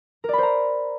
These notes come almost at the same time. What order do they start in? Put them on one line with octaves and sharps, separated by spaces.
A#4 D5 B5 C5 A#5